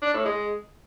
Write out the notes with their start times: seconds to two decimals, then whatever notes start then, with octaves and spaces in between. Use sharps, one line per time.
0.02 D4
0.14 A2
0.25 G#3